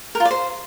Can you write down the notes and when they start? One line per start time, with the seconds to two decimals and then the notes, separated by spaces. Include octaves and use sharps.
0.15 A#4
0.20 F4
0.25 D5
0.31 C5